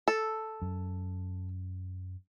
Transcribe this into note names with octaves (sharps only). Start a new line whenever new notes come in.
A4
F#2